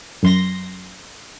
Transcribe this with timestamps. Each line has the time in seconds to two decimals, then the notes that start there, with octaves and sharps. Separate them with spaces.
0.23 F#2 C6 A#6